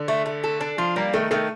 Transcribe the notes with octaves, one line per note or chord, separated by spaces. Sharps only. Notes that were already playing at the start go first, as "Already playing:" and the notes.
Already playing: D3
A3
A3
A4
D4
F3 F4
G3 A#3
D#3 A3
D#3 A3